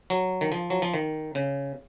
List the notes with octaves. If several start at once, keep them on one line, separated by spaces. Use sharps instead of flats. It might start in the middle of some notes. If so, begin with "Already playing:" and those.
F#3
D#3
F3
F#3
F3
D#3
C#3